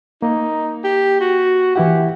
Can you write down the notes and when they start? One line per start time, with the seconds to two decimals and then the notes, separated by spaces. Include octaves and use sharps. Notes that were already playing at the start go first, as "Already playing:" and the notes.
0.22 A#3 D#4
0.84 G4
1.20 F#4
1.76 E3 E4 G4 F#5